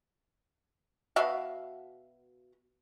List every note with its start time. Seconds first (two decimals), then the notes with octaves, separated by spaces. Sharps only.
1.16 B2 F#4 E5 F5